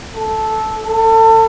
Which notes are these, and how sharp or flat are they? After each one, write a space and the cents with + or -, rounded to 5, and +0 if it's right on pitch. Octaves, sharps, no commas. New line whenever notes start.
A4 -10
A4 +30